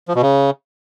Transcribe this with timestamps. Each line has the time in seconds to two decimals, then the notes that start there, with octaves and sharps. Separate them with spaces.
0.08 F3
0.15 B2
0.22 C#3